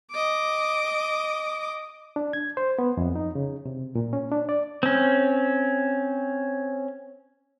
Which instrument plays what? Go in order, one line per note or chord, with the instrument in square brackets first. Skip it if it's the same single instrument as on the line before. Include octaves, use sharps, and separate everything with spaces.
[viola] D#5 D6
[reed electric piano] D4
G#6
C5
B3
F2
D#4
C#3
C3
A#2
C#4
D4
D5
[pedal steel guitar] C4 C#4